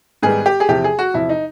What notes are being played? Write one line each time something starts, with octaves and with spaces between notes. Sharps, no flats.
G#2 D#3 G3 B3 G#4
G4
G#4
E2 C3 F3 G4
G#4
F#4
E2 C3 F3 E4
D#4